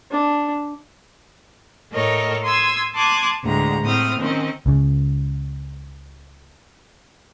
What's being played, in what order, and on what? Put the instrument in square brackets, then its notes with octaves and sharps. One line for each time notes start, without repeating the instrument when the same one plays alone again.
[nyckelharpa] D4
[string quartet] A2 A4 A#4 C#5 D#5
C6 D#6 E6 G#6
A5 C6 D6 D#6 F#6 G#6
D2 A2 G#3 A#5
A2 A3 C4 D#6 F6
D#3 C4 C#4 D#5
[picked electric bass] C#2 C#3